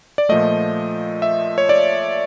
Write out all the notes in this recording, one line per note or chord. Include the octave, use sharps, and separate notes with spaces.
D5
A#2 F3 A3 D#5
E5
C#5
D5